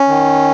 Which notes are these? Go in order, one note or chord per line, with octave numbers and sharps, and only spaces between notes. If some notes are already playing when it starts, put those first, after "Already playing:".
Already playing: C#4
D#3